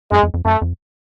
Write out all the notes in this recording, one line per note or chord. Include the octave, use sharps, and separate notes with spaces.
F#2 G#3
F2
F2
F#2 A3
F2